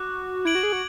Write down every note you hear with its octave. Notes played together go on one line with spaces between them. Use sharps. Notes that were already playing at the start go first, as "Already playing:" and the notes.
Already playing: F#4 D6 F#6
E4 G#6 D7 F#7
F#4
G#4
F#4